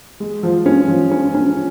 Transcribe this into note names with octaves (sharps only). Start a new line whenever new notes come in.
G#3
F3
C#4
F3
C#4
C#4